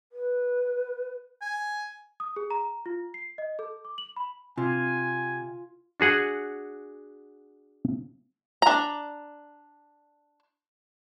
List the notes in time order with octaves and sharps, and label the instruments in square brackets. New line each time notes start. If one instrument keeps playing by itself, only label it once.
[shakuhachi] B4
[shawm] G#5
[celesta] D#6
G#4
A#5
F4
C7
D#5
A4
D6
F#7
B5
[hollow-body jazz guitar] C3 [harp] F4 [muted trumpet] G#5
[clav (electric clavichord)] D4 F#4 G#4 F#5 G#5
[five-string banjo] D4 A#5